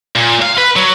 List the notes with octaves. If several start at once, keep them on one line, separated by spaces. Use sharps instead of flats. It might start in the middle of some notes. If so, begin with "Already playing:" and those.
A#2
F5
B4
F#3